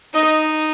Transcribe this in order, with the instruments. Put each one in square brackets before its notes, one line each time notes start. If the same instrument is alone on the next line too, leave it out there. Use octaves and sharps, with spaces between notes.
[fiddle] D#4 [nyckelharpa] D#5